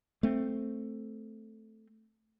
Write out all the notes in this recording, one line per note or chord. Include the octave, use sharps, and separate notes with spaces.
A3 C4